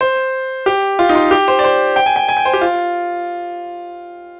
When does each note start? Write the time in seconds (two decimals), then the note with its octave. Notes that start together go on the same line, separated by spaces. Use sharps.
0.01 C5
0.66 G4
0.99 F4
1.09 D#4
1.15 F4
1.31 G4
1.48 C5
1.59 D5
1.64 C5
1.96 G5
2.06 G#5
2.16 G5
2.29 G#5
2.37 G5
2.45 C5
2.53 G4
2.61 F4